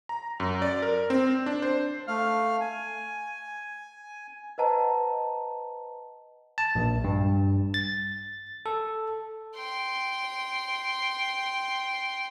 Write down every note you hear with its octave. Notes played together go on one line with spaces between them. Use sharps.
A#5
F#2
D5
A#4
C4
D4
C5
A3 F5 F6
G#5
B4 C5 D#5 F#5 A5 A#5
A5
A#1
G2
A6
A4
G5 C6